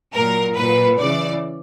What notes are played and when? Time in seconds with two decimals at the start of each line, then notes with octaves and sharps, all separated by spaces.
0.14 A#2 F#3 A#4
0.55 A#2 F#3 B4
0.98 C#3 E3 D5